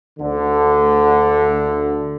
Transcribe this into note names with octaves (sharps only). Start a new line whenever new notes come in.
D2 D3